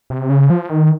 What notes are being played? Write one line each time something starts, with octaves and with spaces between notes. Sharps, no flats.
C3
C#3
F3
D#3